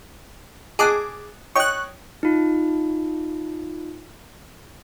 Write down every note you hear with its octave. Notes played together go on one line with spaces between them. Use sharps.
G#4 D#5 A5 D6 F#6
C#5 D#5 G5 C#6 F#6
D#4 F4